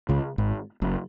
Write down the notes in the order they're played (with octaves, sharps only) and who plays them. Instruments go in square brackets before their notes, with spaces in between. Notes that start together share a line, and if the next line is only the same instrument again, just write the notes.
[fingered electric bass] C#2 C#3
G#1 G#2
F#1 F#2